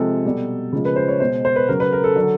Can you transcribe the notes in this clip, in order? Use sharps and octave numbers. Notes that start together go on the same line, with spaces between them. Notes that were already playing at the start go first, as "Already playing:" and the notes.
Already playing: C3 F3 G#3 A4
B2 G3
C#3 F3 G#3
B4
C5
C#5
B2 G#3 C5
C5
B4
C#3 F#3 A#4
B4
A#4
A4
D3 F#3